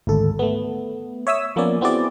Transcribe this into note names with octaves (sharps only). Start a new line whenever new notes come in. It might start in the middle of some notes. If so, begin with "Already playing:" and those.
G#1 D2 A4
A3 B3
C#5 E5 D#6 E6
F3 A#3 B3 C#4 D5
B3 C4 E4 F#4 G#4 D5